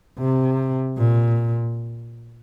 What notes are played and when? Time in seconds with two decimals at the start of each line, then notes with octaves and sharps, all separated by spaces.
0.19 C3
0.98 A#2